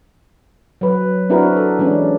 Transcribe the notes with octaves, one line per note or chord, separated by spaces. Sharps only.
F#3 B4
C4 D4 E4 F#4 A#4 B4
A4
E3 G#3 C#4 D4